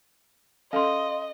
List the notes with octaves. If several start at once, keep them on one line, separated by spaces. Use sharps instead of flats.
C#4 A4 D#5 F5 C6